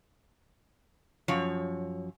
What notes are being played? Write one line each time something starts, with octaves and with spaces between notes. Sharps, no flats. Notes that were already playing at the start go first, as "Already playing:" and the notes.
F#2 F3 C#5